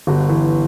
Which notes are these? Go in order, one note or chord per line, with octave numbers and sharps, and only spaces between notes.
G1 F#4
E3